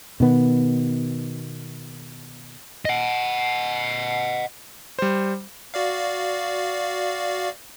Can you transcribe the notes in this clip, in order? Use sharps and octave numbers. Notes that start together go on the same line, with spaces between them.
B2 D#3 B3
D#5 F#5
G3 C5
F#4 D5 F5